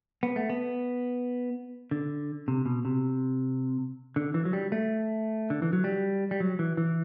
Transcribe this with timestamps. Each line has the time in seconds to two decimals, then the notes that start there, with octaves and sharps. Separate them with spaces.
0.23 B3
0.36 A3
0.50 B3
1.91 D3
2.48 C3
2.66 B2
2.85 C3
4.16 D3
4.34 E3
4.45 F#3
4.53 G3
4.72 A3
5.50 D3
5.62 E3
5.73 F#3
5.84 G3
6.31 G3
6.40 F#3
6.59 E3
6.77 E3